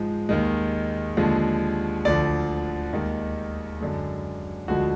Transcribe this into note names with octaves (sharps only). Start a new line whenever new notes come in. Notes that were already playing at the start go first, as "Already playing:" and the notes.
Already playing: G#2 F3 G#3
D#2 D#3 G#3
D#2 D3 F3 G#3
D2 D3 F3 D5
D#2 D#3 G#3
F#2 D3 G#3
D2 D3 F3 G#3 F#4